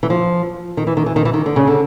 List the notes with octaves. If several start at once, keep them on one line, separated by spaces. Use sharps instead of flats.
E3
F3
D#3
E3
D#3
E3
D#3
E3
D#3
D3
C#3
D3